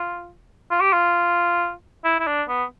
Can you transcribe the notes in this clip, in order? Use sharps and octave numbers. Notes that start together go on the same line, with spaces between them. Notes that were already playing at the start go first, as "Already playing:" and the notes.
Already playing: F4
F4
G4
F4
E4
E4
D4
B3